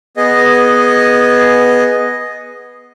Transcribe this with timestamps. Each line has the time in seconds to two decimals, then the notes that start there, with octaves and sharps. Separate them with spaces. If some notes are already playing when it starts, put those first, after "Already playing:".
0.17 B3 G#4 D#5